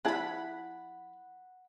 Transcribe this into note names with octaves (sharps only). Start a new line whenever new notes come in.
F3 E4 F#5 A5 B5